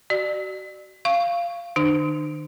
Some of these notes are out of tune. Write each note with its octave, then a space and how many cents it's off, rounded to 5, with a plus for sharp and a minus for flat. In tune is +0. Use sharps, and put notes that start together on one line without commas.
F#4 +30 D5 +30
F5 -15 C#6 +0
D#3 -35 D4 +45